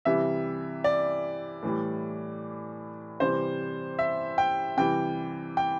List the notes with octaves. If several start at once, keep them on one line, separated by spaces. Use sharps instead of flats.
C3 E3 G3 E5
D5
A2 E3 G3
C3 E3 G3 C5
E5
G5
C3 E3 G3 G5
G5